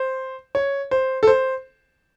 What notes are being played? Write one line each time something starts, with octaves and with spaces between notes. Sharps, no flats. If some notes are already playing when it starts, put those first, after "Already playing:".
Already playing: C5
C#5
C5
A4
C5